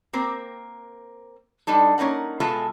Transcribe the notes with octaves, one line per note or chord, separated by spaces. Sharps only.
A#3 C4 A#4
G3 D4 D#4 A4
A#3 C#4 D#4 A#4 F#5
B2 G#3 F4 A4 E5 G#5